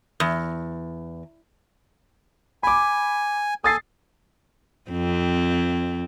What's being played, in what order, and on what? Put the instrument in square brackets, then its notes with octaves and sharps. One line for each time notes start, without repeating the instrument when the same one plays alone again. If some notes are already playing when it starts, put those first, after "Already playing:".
[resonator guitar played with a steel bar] E2
[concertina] G#5 [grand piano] B5 D6
[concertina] A4 G#5 [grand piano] D#6 A6 C7
[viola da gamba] F2 C4